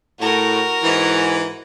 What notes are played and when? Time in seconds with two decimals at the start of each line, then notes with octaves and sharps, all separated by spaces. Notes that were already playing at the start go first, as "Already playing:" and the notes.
0.19 A2 F#4 A#4
0.83 G#2 E3